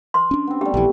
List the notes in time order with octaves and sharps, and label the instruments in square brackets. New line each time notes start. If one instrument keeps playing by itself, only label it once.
[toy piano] B4 C6
[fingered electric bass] C#4 D4
[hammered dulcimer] B3 C4
[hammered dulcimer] G3 A3 [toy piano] G4
[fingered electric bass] A#1 E3 [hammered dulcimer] A3